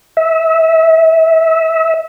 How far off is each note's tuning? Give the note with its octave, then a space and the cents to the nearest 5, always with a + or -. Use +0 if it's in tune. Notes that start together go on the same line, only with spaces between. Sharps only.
E5 -25